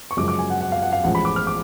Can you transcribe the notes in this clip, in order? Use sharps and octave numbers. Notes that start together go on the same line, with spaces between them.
C#6
F#2 C#3 F3 G#3 D6
D6
G#5
F#5
F#5
F5
F#5
F5
A1 A2 F3 G#3 F#5
B5
D6
F6
D6